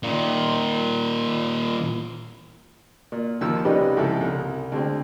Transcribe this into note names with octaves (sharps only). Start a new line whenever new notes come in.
A#2 D#3
A#2
D#2 D#3 F3 E6
C2 G3 C#4 D#4 G4 B4
C#2 G#2 F3 E4 A4
C2
D2 G#3 C4